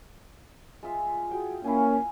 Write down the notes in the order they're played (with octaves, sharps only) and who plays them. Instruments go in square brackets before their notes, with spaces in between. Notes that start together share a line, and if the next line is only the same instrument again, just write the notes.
[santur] G#3 F4 E5
[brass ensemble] F#4 G#4 [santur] G5
[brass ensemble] A#3 C#4 [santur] E4 F5 G#5